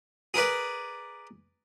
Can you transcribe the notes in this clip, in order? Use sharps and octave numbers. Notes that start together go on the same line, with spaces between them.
G#4 A#4 B4 D5